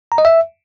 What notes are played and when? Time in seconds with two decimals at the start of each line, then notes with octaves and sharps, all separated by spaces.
0.12 A#5
0.18 D#5
0.25 E5